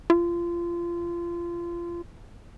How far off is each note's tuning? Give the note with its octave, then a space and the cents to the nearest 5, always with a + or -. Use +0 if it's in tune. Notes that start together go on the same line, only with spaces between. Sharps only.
F4 -25